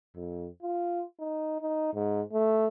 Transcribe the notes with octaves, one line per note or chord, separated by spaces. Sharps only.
F2
F4
D#4
D#4
G#2
A3